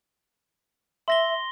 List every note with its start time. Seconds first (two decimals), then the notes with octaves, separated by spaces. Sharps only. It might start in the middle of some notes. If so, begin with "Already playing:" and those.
1.08 E5 C6 A#6 G7